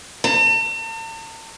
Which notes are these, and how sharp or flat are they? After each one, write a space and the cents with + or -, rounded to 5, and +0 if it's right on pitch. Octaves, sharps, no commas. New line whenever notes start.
A5 +45